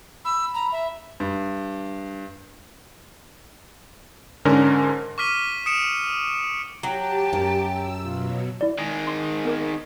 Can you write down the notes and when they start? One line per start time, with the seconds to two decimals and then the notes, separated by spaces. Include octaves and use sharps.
0.25 B5 E6
0.54 A#5
0.72 E5
1.20 G2
4.45 G#2 D3 C#4 A#4
5.18 C#6 D6 F6 B6 D#7 G7
5.66 D#6 C#7 D7 E7
6.83 F#3 G4 G5 A5
7.33 F#2
7.66 E6
8.02 B2 F#3 F4
8.61 E4 D5
8.79 D#3 G#3
9.07 C6 D6
9.45 B3 A#4 D6